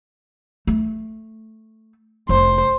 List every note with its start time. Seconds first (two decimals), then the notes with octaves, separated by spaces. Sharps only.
0.67 A3
2.29 F1 C5